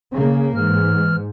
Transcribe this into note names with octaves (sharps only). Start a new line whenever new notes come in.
C#3 A#3
G#2 E3 F6